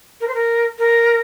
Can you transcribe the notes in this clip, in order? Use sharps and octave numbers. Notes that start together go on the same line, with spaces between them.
A#4
C5
A#4
A#4